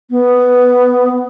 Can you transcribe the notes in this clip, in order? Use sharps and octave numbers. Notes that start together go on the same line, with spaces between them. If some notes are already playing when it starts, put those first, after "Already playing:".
B3